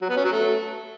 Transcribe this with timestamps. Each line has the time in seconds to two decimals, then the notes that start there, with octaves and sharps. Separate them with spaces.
0.02 F#3
0.09 B3
0.17 C#4
0.24 F#3
0.32 A3